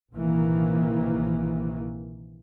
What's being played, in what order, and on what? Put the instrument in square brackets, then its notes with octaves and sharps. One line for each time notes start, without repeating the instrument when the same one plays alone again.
[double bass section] A#1 C3 D#3 E3 A#3